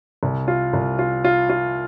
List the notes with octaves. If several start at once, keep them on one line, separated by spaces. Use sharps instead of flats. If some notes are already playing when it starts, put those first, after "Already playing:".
C2
F4
C2
F4
F4
F4